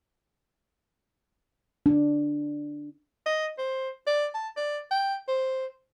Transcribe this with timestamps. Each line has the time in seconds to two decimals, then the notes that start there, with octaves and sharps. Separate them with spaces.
1.86 D4
3.26 D#5
3.58 C5
4.07 D5
4.34 A5
4.56 D5
4.91 G5
5.28 C5